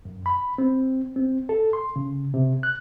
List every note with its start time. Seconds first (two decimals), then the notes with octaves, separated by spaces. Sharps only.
0.05 F#2
0.26 B5
0.58 C4
1.16 C4
1.49 A4
1.73 C6
1.96 C#3
2.34 C3
2.63 F#6